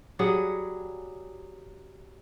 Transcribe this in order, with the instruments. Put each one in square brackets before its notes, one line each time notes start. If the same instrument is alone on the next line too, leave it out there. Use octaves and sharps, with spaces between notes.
[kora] F#3 G3 G#4 F#5